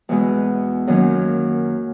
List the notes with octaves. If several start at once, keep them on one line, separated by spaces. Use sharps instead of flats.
E2 B2 G#3 B3
F#2 D#3 F#3 A#3 C#4